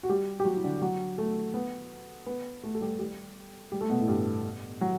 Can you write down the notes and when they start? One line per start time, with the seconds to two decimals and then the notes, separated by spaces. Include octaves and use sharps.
0.03 F#4
0.09 G3 G4
0.40 G4
0.45 F#3 F#4
0.57 E4
0.64 D3 D4
0.82 F#3 F#4
1.18 A3 A4
1.54 B3 B4
2.26 B3 B4
2.63 A3 A4
2.75 A4
2.81 G3 G4
2.99 G3 G4
3.72 G3 G4
3.81 A3 A4
3.90 B2 B3
3.99 A2 A3
4.08 G2 G3
4.81 F#3